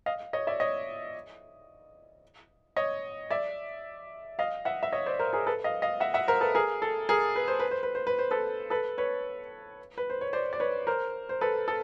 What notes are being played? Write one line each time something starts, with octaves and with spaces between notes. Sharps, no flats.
D#5 F5
C#5 D#5
D5 E5
C#5 D#5
C#5 D#5
D5 E5
D#5 F5
E5 F#5
E5
C#5 D#5
C5 D5
A#4 C5
G#4 A#4
A4 B4
D#5 F5
D#5 F5
E5 F#5
E5 F#5
A#4 C5
A4 B4
G#4 A#4
A4
G#4 A#4
B4
C5
B4
C5
B4
C5
B4
C5
A4 B4
A4 B4
B4 C#5
B4
C5
C#5
C5 D5
D5
B4 C#5
A#4 C5
C5
A4 B4
A4